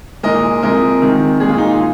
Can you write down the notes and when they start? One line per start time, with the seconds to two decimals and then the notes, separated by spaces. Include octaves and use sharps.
0.23 A#2 G#3 A#4 D#5
0.63 C3 F3 G#3 A#4 D#5
1.02 C3 D#3 G#3
1.40 A#2 G#3 G#4
1.49 F4
1.58 D#4
1.67 F4
1.79 G#3